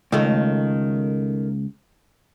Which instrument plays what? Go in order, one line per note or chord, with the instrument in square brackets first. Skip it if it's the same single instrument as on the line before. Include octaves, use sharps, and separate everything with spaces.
[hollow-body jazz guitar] C#2 [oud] D#3 A3